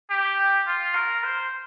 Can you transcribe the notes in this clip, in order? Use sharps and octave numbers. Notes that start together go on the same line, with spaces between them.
G4
F4
A#4
C5